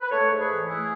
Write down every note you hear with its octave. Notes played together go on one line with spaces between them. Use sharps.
B4
A3 A4 C#5
G#2
G#4 B4
E3
A3 E4 G#4